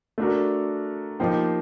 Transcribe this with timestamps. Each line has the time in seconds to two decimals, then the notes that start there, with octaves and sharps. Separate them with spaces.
0.18 A3 D4 F#4 A#4
1.20 F3 A#3 D#4 G4 C5